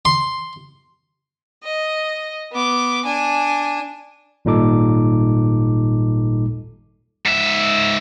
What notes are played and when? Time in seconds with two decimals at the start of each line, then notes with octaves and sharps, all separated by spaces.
0.05 C6
1.63 D#5
2.52 B3 D6
3.05 D4 G#5
4.45 G#1 A#2 G3 D#4 A4 D6
7.26 G#2 E5